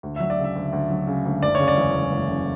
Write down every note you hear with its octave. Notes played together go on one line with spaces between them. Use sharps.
D2
F#3 E5
D5
C#3
E5
D2
D2
F#3
C#3
D2
F#1 D5
C#3 C#5
D5
E2
F#1
F#1
C#3